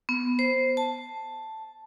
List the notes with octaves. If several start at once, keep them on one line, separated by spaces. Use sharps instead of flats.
B3
C5
A5